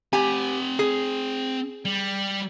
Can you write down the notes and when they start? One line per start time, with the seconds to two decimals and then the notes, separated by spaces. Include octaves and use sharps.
0.13 C4 G4 F#5 G#5
0.79 G#4
1.85 G3